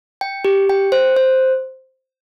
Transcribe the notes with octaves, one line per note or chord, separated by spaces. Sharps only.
G5
G4
G5
C5
C5